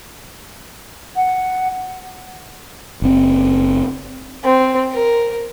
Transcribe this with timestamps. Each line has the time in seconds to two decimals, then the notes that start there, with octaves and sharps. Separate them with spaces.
1.16 F#5
3.02 F#1 C4
4.44 C4
4.93 A#4